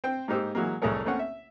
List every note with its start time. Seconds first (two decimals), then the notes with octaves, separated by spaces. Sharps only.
0.04 C4 C5 G5
0.28 G#2 A#3 D#4 G4 C5 E6
0.55 E3 F#3 G#3 A#3
0.82 C2 F2 A3 G#4 A#4 C#5
1.05 A3 A#3 C4 C#4 C#5 F#5
1.19 E5